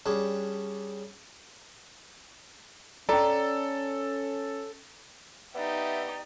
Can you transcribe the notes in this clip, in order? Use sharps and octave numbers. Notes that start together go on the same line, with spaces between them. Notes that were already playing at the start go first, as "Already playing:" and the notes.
G3 C#4 D4 G#4
C#4 A4 D5 G5 A#5
B3 D#4 G4 D5 E5